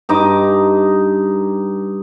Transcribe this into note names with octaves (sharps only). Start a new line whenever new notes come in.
G2 D#4 D#5 D6